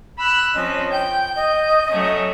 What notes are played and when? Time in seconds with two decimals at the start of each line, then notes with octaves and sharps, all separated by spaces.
0.19 B5 E6 F#6
0.55 F3 C4 C#4 D#5
0.92 G5 G6
1.36 D#5
1.90 F#3 A3 C#4